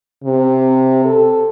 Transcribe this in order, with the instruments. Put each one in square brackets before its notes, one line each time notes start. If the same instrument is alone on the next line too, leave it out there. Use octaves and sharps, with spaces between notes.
[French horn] C3
A4